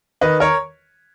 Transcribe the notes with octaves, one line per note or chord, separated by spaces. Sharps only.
D#3 B4 D#5
A#4 C#5